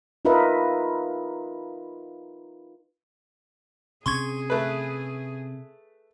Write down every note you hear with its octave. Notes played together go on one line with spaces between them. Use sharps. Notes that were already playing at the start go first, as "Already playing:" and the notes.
D#4 F4 A#4 B4 D#5 E5
C3 C#4 G#4 C6 C#6 G#6
A3 B4